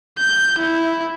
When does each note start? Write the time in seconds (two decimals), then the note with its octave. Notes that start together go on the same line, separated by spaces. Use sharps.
0.18 G6
0.59 E4